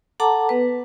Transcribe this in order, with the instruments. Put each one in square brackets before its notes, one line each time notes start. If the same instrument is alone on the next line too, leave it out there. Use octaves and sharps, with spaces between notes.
[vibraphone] A4 F#5 A5 A#5 D6
B3 B4